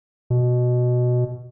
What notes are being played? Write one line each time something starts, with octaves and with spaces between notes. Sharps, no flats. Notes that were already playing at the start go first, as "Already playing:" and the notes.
B2